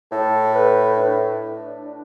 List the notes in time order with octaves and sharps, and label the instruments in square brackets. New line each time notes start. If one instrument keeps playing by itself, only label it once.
[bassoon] A2 [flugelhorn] A4
[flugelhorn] B4
D4